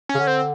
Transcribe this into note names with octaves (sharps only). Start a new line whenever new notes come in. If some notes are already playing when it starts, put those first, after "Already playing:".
C#4
C#3
D3
C4